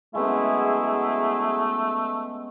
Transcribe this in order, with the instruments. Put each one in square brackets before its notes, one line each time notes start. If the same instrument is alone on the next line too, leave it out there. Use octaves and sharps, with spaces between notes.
[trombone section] F#3 E4 G#4 [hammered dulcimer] G#3 B3 C#4 [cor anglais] A3